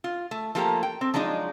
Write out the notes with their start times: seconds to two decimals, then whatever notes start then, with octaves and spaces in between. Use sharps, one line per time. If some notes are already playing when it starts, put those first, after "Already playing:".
0.04 F4
0.31 A3
0.55 F3 A3 A#3 G4 A4 A#5
0.83 G5
1.01 C4
1.14 F3 F#3 G#3 D4 D#4